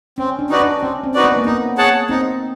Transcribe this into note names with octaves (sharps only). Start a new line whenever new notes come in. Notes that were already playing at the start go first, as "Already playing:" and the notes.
C4 C#4
D4
D#4 F#4 B4 D5
D4
C4 C#4
C4
D#4 F#4 B4 D5
B3
A#3
B3 D#4
G#4 C#5 F#5 A5
C4 D#4